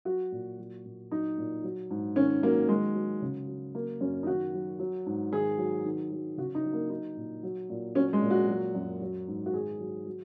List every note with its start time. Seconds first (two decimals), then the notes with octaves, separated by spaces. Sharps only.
0.05 F#3 F#4
0.32 A#2
0.59 F#3
0.85 A#2
1.12 F#3 D#4
1.38 A#2
1.64 F#3
1.91 G#2
2.16 D#3 C#4
2.43 F#3 A#3
2.69 D#3 G#3
2.95 F#3
3.22 C#3
3.48 F#3
3.75 F#3 A#3
4.01 F#2 C#4
4.23 D#4
4.27 D#3 F#4
4.54 F#3
4.79 F#3
5.06 G#2
5.33 D#3 G#4
5.58 F#3
5.85 D#3
6.11 F#3
6.37 C#3 F#4
6.55 D#4
6.64 F#3
6.73 A#3
6.90 F#3 D#4
7.16 A#2
7.43 F#3
7.70 A#2
7.95 F#3 C#4
8.13 G#3
8.22 A#2
8.31 F#4
8.48 F#3
8.75 F#2
9.01 F#3
9.28 G#2
9.46 F#4
9.53 D#3 G#4
9.80 F#3
10.06 F#3